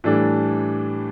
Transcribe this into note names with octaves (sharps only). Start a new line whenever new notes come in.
A2 E3 G3 D4 A4